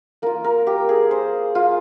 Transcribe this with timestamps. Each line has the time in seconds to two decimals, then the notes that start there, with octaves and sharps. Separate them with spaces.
0.22 A#3 F4 A#4
0.44 A#4
0.67 G4
0.89 G#4
1.11 C5
1.55 F4